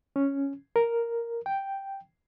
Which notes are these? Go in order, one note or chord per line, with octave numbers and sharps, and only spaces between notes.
C#4
A#4
G5